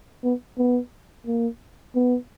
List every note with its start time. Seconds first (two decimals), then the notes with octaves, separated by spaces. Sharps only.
0.23 B3
0.58 B3
1.27 A#3
1.95 B3